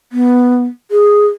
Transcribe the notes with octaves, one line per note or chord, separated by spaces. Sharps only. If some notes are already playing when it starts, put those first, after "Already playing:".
B3
G#4